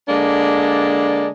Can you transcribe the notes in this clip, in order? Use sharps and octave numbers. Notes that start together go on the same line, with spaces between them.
D3 G#3 A#3 D4